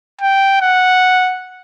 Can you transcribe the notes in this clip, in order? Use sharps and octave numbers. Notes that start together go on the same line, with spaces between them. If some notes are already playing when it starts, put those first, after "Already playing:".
G5
F#5